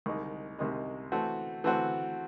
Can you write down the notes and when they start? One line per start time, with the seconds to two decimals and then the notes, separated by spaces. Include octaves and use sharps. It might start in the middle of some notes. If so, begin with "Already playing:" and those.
0.06 C2 C3 D#3 G#3 D#4
0.58 C2 C3 D#3 G#3 D#4
1.12 E3 A3 C4 F#4
1.64 E3 A3 C4 F#4